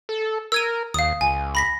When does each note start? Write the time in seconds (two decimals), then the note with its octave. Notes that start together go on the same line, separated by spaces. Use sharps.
0.09 A4
0.52 A#4 E6 G#6 D#7
0.94 D#2 F5 D#6
1.21 C#2 G#5
1.55 B5 A#6 B6